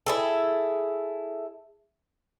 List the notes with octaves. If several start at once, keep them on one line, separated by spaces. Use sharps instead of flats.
E4 G#4 A4